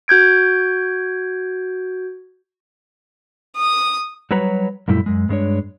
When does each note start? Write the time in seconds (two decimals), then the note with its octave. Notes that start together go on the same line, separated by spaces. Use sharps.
0.08 F#4 G6 G#6 D7
3.57 D#6
4.31 F#3 G3 F#4 B4 C#5 A#5
4.88 F#2 A#2 G3 A3 E4
5.06 F#2 G#3
5.29 G2 G#3 D4 C#5